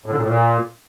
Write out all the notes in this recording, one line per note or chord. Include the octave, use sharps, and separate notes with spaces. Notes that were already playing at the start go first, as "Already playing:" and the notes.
A2
D3
A#2
A2
A#2